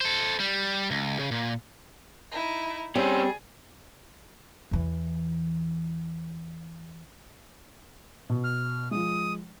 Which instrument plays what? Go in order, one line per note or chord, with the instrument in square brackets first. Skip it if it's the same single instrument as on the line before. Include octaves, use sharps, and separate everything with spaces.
[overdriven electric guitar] A4 C5
G3
C#2
C#3
A#2
[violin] D#4 E4
[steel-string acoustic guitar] G3 [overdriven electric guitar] C4 C#4 [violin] G#4
[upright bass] E2 E3
[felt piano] B2
[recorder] F6
[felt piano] F3 G#3 [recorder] D#6